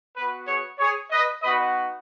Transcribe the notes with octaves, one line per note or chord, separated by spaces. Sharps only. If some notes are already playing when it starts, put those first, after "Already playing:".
B3 F#4 B4
G#4 C#5
G#4 C#5
B4 D#5
B3 D#4 F#4 B4 D#5